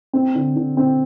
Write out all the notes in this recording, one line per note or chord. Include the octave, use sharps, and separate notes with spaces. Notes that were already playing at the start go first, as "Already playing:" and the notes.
C4
D3
D3
C4